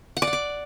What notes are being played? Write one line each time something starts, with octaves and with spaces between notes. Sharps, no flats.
F#5
D5
F#5
D6